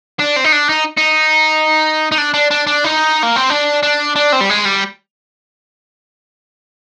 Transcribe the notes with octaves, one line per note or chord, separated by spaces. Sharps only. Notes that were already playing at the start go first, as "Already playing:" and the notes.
D4
C4
D#4
D4
D#4
D#4
D#4
D4
D4
D4
D4
D#4
A#3
C4
D4
D4
D4
C4
G3
G#3
G3